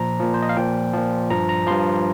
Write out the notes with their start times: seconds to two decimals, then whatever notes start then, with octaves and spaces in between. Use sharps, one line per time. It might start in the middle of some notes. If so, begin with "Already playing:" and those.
Already playing: A#2 F3 A#5
0.20 A#2 F3
0.34 C5
0.42 D#5
0.49 F5
0.57 A#2 F3 G5
0.93 A#2 F3
1.30 G2 F3 A#5
1.49 A#5
1.67 G2 F3 C6